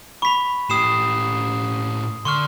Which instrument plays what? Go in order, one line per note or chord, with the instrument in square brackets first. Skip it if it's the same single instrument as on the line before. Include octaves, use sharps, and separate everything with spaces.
[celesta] B5 F7 [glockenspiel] C#6 B6
[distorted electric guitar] A2 G4 [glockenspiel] D#6 C7 E7
[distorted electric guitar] D3 [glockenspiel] C6 C#6 F6